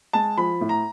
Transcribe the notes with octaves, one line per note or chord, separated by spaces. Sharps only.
G#3 A5
F3 B5
A2
A#5